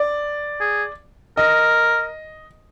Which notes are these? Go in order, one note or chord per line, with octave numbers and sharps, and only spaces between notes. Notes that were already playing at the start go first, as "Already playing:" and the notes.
Already playing: D5
G#4
A#4 D#5